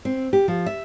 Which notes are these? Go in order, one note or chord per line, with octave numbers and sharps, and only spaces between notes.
C4
G4
F3
E5